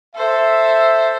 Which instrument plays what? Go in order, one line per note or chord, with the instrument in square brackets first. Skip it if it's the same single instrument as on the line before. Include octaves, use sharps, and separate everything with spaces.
[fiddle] A4 C5 [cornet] E5